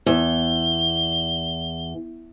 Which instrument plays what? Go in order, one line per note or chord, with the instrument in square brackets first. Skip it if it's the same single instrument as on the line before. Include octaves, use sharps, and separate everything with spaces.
[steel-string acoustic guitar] E2 [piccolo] G7